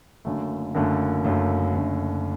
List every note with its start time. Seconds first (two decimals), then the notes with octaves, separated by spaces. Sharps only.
0.25 F#1 F#2 D3 A3
0.75 F#1 F#2 D3 A3
1.24 F#1 F#2 D3 A3
1.74 F#1 F#2 D3 A3